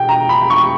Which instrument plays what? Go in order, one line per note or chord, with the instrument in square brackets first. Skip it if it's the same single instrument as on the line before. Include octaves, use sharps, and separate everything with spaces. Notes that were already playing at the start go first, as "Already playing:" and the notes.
Already playing: [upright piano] B2 G5
A#5
B5
C#6